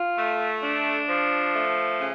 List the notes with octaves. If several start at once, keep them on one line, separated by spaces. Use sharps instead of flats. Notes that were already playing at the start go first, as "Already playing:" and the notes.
Already playing: F4
A3
D4
F3
A3
C#3